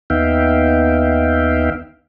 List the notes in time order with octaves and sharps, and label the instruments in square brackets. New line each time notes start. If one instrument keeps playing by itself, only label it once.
[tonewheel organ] D#2 B3 D#4 E5 F5 G5